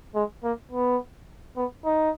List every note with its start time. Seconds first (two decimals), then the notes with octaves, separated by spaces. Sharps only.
0.15 G#3
0.43 A#3
0.71 B3
1.56 B3
1.85 D#4